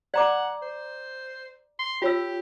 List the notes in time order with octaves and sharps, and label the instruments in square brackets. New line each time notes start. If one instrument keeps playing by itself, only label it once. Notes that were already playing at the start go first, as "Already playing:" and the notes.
[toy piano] D5 A#5 D6 [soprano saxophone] F#5
[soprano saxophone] C5
C6
[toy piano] F4 C#5 E6 [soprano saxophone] G4